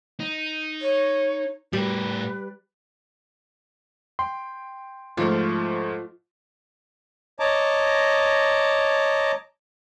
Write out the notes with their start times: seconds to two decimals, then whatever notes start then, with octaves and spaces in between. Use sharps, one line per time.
0.20 D#4
0.82 C#5
1.73 A2 G3 A#4 B4
4.19 G5 C6
5.17 G#2 F3 A3 F4
7.40 C#5 D#5 A5 A#5 D6